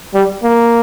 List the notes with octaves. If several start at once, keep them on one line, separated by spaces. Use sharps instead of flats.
G3
A#3